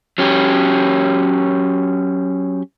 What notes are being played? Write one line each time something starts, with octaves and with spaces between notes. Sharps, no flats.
F#3 C#4 G4